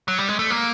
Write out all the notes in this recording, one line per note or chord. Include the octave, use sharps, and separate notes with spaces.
F#3
G3
G#3
A3
A#3